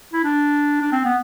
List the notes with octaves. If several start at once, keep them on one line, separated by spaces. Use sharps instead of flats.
E4
D4
D4
C4
B3